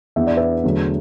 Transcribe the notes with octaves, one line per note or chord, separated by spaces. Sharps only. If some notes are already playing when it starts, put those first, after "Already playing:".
E2 E3 B3 D4 E5
D5
B4 E5
E2 D3 F#3 A3